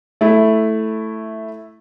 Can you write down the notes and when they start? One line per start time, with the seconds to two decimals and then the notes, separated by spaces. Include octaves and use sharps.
0.21 A3 E4